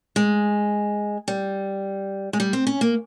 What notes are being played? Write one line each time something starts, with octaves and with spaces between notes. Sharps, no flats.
G#3
G3
G#3
G3
C4
C#4
A#3